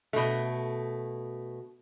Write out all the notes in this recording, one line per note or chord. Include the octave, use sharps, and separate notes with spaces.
B2 A3